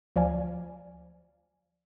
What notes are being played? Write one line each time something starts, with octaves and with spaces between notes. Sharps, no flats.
D2 F3 D5 F5 G#5